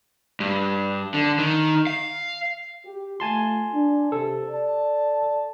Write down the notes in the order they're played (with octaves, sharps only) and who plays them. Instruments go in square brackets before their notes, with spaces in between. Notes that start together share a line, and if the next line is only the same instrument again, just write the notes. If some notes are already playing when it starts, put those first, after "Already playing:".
[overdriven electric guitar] G2
D3
D#3
F5
[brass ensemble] G4
[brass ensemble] A3 F4 [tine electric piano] G#5 A5 C6
[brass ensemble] D4
[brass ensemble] C3 [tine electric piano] A4
[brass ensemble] D5 A5